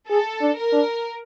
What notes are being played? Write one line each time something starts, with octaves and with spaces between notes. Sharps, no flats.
G#4 A4
D4
A#4
D4